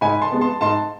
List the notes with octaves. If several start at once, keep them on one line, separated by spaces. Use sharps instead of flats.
G#2 G#5 B5
A5 C6
G#3 B3
A5 C6
G#2 A5 C6